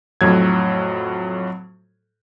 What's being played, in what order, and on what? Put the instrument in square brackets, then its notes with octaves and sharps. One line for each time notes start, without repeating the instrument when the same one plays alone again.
[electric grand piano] F2 A2 F#3 G#6